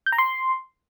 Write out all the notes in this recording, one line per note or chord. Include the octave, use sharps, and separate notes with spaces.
G6
A#5
C6